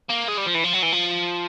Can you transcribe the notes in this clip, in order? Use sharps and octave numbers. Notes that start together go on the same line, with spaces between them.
A#3
G#3
G3
F3
E3
F3
F#3
E3
F3